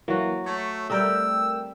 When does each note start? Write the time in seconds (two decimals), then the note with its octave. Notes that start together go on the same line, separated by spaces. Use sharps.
0.08 E3 F#3 A#3 F#4
0.46 A3 C#5
0.90 G3 A3 C4 G4 A#4 G5 E6